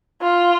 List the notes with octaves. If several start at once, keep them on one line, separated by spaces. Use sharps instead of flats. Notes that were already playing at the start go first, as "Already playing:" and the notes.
F4